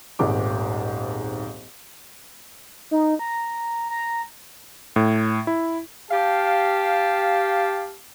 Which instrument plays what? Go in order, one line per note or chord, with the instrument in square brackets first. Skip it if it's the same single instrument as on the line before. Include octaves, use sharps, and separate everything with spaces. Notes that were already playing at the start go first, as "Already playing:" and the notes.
[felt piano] D#1 G#1 G#2 D6
[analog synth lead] D#4
A#5
A#5
[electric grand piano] A2
E4
[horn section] G4 F5 A5